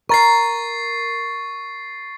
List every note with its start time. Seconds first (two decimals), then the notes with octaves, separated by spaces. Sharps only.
0.09 A#4 C#6 A6 C7